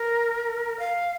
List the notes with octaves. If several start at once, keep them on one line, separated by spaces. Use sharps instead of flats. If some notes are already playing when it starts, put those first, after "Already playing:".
Already playing: A#4
F5